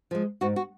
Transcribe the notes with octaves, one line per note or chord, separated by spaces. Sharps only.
F3 G#3
G#2 F#4
F#4